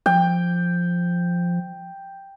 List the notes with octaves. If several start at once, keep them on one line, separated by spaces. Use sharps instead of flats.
F3 G5